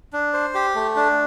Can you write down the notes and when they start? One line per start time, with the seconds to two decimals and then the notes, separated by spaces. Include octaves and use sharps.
0.13 D4
0.33 C5
0.54 G4
0.75 A3
0.96 D4